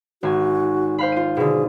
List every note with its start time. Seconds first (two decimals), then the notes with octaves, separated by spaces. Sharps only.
0.23 G#1 F#4 G#5
0.98 C5 F5 B5
1.12 F4 D#7
1.37 B2 D3 G#4